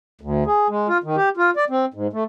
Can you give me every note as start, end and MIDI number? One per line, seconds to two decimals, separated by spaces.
0.21 0.44 38
0.47 0.68 68
0.69 0.88 56
0.88 0.98 65
1.04 1.16 51
1.16 1.29 67
1.37 1.50 65
1.57 1.65 74
1.70 1.85 60
1.94 2.07 44
2.13 2.24 57